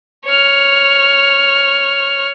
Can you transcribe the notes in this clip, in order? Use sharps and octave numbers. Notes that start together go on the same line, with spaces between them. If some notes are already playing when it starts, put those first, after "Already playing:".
C#5 F6